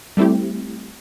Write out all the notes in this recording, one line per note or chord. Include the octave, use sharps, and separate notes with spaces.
G3 A3 C4 E4 G4